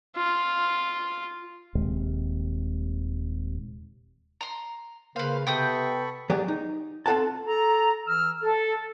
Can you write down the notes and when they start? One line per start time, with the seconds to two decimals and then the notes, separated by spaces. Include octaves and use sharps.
0.17 F4
1.75 D#1 D#2 C3 G#3
4.41 A#5 C6
5.16 C#3 A#3 B4 C5 F5
5.47 C3 B3 A4 G5 B5 C#6 D#6 G6
6.30 F#3 G4 G#4 D5
6.48 D#4
7.06 C4 F4 A4 F#5 A5
7.47 A4 A#5
8.07 E3 E6 F6
8.43 A4